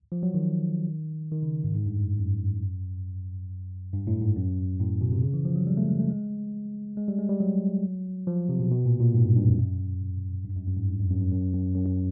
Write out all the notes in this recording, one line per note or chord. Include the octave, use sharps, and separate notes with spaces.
F3
F#3
D#3
D#3
C#3
G#2
G#2
G2
F#2
F#2
G2
A2
G#2
F#2
A2
B2
C3
C#3
E3
F3
F#3
G3
A3
G#3
A3
G#3
G#3
G3
G#3
G3
F#3
F3
C3
B2
B2
A#2
A#2
G#2
G2
G2
F2
F#2
G2
F#2
F#2
G#2
G2
F2
F#2
F#2
F#2
F#2
F#2
F#2